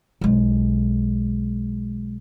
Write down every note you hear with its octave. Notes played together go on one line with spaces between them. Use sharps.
B1 G#3